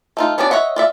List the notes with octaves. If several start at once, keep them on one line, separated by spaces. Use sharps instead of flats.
A3 D#4 F4
B3 C#4 D4 F#4 D5
C#5 D#5 E5 F#5
F4 D5 E5